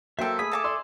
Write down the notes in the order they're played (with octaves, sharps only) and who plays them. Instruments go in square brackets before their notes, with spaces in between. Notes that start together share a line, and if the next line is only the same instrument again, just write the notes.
[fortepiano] F#3 A#3 G5 [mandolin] A4 C5 [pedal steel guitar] E5
[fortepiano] A3 G#4 [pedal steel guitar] E5 G#5 D#6 [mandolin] B5
[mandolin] A4 A5 D6
[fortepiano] D5 C6 E6